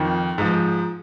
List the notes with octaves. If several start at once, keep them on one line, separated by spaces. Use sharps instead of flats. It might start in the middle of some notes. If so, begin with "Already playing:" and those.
Already playing: F2 D#3
G#2 F3